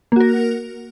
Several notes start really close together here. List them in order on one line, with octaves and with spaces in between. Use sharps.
A#3 F#4 A#4